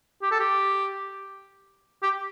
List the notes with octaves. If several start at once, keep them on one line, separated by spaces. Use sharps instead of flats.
G4
A4
G4
G4